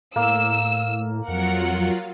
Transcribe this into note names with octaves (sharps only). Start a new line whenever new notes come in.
A2 A#3 E6
F2 F#3 F4 A#4 F#5